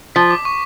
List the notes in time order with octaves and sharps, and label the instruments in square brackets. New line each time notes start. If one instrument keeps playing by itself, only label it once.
[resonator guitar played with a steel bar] F3 [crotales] B6
[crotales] D6
C#6